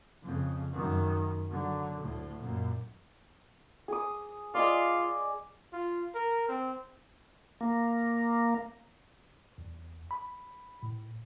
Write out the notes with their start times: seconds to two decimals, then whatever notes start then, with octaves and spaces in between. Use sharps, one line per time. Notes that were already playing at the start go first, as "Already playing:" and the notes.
0.22 F2 C#3
0.72 F#2 D#3
1.49 D3 F#3
2.01 D2 A2
2.40 F#2 A#2
3.88 G#4 D#6
4.54 F4 D5 D#5 G#5
5.73 F4
6.15 A#4
6.49 C4
7.61 A#3
9.58 E2
10.11 B5
10.83 A2